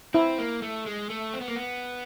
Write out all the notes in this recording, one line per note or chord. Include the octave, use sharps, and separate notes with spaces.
C4 E4
A#3
A3
G#3
A3
C4
B3
A#3
B3